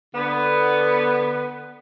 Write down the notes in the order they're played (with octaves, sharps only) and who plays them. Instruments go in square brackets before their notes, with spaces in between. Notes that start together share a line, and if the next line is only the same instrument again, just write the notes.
[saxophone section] D3 B3